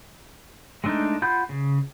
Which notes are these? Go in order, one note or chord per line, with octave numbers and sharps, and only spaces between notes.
G#3 A3 D4 D#4
F4 F#5 B5 G6
C#3